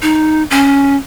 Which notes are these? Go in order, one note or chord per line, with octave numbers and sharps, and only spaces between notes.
D#4
C#4